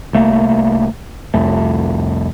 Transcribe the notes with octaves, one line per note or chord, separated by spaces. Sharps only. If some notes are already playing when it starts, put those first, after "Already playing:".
C2 A3 A#3
C2 F2 A3